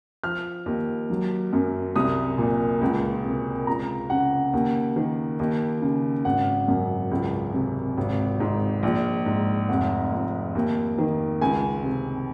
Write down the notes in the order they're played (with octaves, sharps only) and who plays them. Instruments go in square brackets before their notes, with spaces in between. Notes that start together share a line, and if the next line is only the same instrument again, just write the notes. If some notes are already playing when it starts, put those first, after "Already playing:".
[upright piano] F3 F6
D#2
F#3
F#2
C2 D#6
A#2
C#2
C3
C#2 A#5
C#3 F#5
D#2
D#3
D#2
C#3
G#1 F#5
F#2
C#2
C3
G#1
G#2
A#1
G#2
F1 F#5
F2
D#2
D#3
C#2 G#5
C3